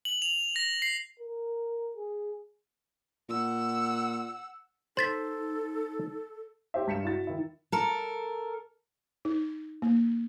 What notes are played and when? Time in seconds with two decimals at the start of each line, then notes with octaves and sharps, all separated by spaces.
0.05 F#7
0.22 F7
0.56 A#6
0.82 C7
1.20 A#4
1.96 G#4
3.29 A#2 F#5 E6
4.97 D#4 A4 C5 C6 A6 B6
6.74 G4 C5 E5
6.87 G2 B6 C#7 E7
7.04 E4 F#4 A6
7.27 D#3 E4
7.72 A4 A#4
9.25 D#4
9.82 A#3